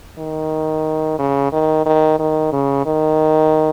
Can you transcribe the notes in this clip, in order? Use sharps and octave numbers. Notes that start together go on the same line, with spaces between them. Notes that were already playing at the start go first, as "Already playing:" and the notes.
D#3
C#3
D#3
D#3
D#3
C#3
D#3